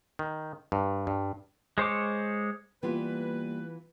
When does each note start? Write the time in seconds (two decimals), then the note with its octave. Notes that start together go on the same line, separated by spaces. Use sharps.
0.19 D#3
0.72 G2
1.07 G2
1.78 G#3 C5 C#5 D6
2.83 E3 G3 A#3 B3 F4 B4